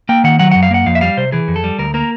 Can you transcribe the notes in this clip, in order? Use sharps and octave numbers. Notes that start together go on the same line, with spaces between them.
A#3 G5
D#3 F#5
F#3 F#5
F#2 F#5
F5
A#3 F#5
F2 F5
E5
G3 F5
C3 C5
E3 G#4
F2
A4
G3
D2 A#4
A#3 A#4